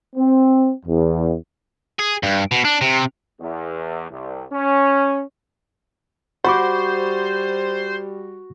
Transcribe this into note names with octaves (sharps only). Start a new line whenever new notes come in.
C4
E2
G#4
G2
B2
D4
C3
E2
C2
C#4
G3 F#4 C5 F#5 B5 C#6 D6